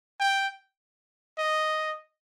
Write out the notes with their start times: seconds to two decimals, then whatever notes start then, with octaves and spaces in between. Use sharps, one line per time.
0.20 G5
1.38 D#5